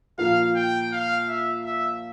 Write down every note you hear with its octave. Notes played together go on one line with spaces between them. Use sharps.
A#2 F3 A#3 F4 F5
G5
F5
E5
E5